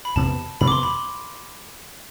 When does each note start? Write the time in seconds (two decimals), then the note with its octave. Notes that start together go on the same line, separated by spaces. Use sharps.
0.05 B5
0.16 F2 C3 E3 B3 A5
0.61 F2 C3 E3 B3 B5
0.68 D6
0.72 C6
0.83 B5